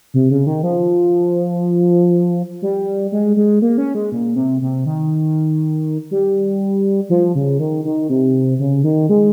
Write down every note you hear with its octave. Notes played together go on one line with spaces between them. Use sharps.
C3
C#3
D#3
F3
G3
G#3
G#3
A#3
C#4
G#3
A#2
C3
C3
D#3
G3
F3
C#3
D#3
D#3
C3
C#3
D#3
G#3